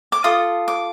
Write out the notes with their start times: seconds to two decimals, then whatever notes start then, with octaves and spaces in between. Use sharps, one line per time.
0.12 D6
0.24 F4 A4 D#6
0.68 D6